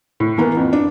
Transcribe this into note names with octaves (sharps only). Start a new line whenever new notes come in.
A2
E3 A#3 B3
F2
D4